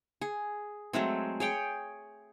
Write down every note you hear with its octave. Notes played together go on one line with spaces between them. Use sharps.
G#4
F#3 G#3 A3 C4
G#4 C#5 G5